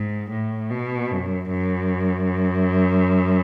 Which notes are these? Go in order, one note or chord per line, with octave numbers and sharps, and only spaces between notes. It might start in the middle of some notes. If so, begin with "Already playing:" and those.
Already playing: G#2
A2
B2
F#2
F#2